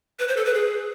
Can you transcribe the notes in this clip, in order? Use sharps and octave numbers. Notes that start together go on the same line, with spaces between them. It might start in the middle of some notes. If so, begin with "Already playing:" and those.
B4
C5
A4
B4
G#4